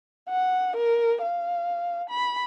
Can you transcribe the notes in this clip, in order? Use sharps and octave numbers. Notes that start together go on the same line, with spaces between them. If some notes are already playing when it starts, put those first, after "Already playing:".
F#5
A#4
F5
B5